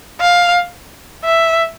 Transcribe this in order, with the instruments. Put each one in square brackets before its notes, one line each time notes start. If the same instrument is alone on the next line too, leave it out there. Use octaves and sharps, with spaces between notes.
[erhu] F5
E5